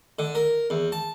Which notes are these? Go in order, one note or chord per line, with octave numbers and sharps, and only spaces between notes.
D3
A#4
E2
A5